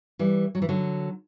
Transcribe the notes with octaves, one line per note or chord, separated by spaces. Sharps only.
E3 G3
F#3
E3
D3 F#3